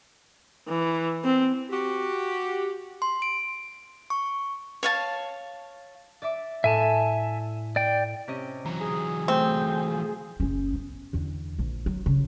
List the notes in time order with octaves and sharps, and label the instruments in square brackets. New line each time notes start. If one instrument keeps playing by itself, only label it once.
[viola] E3
C4
[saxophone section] F#4 G4
[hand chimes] C6
D7
C#6
[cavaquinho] C#5 F5 A5
[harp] D5 E5 D6
[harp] A2 [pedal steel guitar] E5 G#5 A5
[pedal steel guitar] D5 G5
[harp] C3 C#4 D#5
[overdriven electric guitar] E3 F#3 [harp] A#5
[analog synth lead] G#4
[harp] A3 [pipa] C4
[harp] F3
[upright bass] F#1 C#4
B3
E2 D3
A#1
F#3
C#3